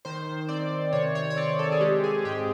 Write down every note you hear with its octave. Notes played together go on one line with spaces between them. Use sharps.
D#3 C5
C4 D5
C3 C#5
C#5
C#5
C4 D5
A4
G#4
G#3 G4
G#4
G#2 G4